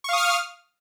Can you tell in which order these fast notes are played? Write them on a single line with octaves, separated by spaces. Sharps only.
C#6 F5 D#6 F6